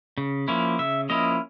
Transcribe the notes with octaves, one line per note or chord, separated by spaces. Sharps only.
C#3
F3 A#3 C#4 E4
C#3 E5
F3 A#3 C#4 E4 D#5